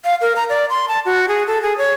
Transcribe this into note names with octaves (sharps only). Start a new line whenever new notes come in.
F5
A#4
A#5
D5
C6
A5
F#4
G#4
A4
G#4
C#5